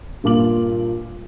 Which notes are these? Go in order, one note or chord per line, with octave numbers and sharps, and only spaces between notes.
G2 A#2 F4 D6 F#7